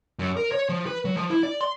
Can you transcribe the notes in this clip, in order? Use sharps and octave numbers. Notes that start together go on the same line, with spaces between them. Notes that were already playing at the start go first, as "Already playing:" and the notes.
F#2
A#4
C#5
F3
B4
F#3
F3
E4
D5
C6